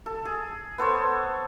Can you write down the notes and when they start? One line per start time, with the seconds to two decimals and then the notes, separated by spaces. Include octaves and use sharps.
0.06 A4
0.25 G#4
0.78 B3 A4 C5 C#5